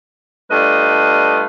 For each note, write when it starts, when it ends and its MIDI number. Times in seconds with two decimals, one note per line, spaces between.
0.50 1.45 55
0.50 1.45 57
0.50 1.45 62
0.50 1.45 65
0.50 1.45 71
0.50 1.45 75